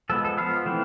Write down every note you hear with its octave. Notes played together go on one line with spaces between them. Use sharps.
F3 G#3 B3 A4
A4
F3 B3 F5
E3 A3 C4